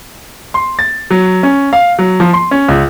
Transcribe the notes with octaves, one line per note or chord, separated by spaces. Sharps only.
C6
A6
F#3
C#4
F5
F#3
F3
C6
C#4
C#2